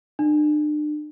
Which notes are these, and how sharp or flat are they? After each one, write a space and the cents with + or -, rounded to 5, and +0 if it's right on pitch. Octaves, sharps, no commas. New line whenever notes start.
D4 +40